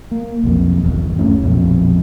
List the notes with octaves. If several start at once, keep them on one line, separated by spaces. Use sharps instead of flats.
A#3
B1 F2
G1 E2
D1 F#2 A2 C#4
A#1 F2 B2